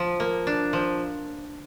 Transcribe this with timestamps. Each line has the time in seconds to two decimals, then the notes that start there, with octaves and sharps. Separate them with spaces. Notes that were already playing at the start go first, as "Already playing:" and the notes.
Already playing: F3
0.20 A#3
0.47 D4
0.73 F3